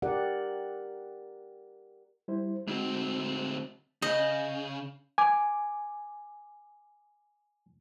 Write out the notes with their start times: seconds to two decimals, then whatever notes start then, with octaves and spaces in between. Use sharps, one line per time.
0.02 G4 A#4 D5 F#5
2.28 G3 E4 C5
2.67 D2 G#3 C4 D#4 F#4
4.02 C#3 D#5 G6
5.18 G#5 D6